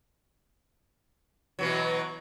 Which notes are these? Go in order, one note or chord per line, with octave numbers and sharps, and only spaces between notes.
B2 E3 F#3